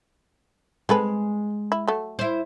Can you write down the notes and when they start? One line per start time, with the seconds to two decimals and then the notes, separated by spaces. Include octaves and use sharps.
0.89 G#3 C4 A4 B4
1.72 E4
1.88 F#3 A3
2.19 E4 C5